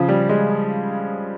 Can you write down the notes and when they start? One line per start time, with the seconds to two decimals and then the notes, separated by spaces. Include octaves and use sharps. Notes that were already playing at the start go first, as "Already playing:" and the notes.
Already playing: C#3 F3
0.08 G3
0.29 G#3